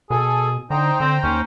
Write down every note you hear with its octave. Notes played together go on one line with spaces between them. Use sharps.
B2 G#4 A4 G#5
D3 D#4 C5 G5 A#5
D3 C4
D#2 C#4